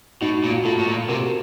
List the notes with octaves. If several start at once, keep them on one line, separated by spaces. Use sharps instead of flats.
A2 D#4 F#4
A#2
F4
F#4
A2 F4 A4
A2
A#2
C3 F#4 A#4